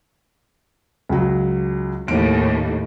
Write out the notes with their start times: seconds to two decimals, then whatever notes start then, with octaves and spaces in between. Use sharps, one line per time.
1.09 C#2 F#3
2.08 D#2 A2 D7